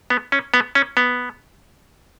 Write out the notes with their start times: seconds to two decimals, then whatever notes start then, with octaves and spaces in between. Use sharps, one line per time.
0.10 B3
0.32 C#4
0.54 B3
0.75 C#4
0.97 B3